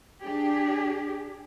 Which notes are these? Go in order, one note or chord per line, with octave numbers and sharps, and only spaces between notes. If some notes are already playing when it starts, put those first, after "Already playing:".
D4 G4 G#4